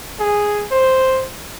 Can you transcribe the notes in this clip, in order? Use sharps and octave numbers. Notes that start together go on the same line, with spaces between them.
G#4
C5